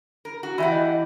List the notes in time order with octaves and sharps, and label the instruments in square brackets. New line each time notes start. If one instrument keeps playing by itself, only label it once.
[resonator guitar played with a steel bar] A#4
F#4
[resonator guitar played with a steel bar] E3 G4 F#5 [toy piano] E5 B5
[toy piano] D#5